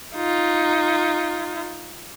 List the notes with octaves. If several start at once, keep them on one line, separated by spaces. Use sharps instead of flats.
D#4 F4